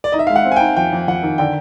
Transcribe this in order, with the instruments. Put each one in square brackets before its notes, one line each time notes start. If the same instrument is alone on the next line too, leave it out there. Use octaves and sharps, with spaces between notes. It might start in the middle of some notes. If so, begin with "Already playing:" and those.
[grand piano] D5
[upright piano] D#4 [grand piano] D#5
[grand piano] E5
F5
[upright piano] G#3
[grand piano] F#5
[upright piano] C4
[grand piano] G#5
[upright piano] D#4 [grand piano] G5
[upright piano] F2 [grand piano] G5
[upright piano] F2
[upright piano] F2 [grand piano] F#5
[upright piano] D#3
[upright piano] D3 [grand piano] G5